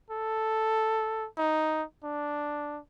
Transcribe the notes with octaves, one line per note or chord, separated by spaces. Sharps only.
A4
D#4
D4